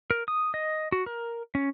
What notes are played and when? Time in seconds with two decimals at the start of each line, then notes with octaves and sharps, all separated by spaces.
0.11 A#4
0.28 D#6
0.54 D#5
0.92 F#4
1.06 A#4
1.55 C#4